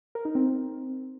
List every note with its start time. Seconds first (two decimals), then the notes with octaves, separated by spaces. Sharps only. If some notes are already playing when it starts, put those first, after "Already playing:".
0.15 A#4
0.25 D#4
0.35 C4